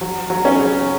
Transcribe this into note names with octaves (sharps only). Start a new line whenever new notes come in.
F#3
F#3
C#4
C#3